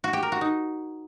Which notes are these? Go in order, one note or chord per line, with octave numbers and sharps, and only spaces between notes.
F#4
G4
A#4
F#4
D#4